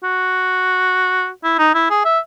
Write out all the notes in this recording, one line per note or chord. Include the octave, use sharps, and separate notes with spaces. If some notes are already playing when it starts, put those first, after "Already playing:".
F#4
E4
D#4
E4
G#4
E5